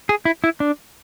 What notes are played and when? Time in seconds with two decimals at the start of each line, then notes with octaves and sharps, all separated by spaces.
0.09 G#4
0.25 E4
0.44 E4
0.60 D4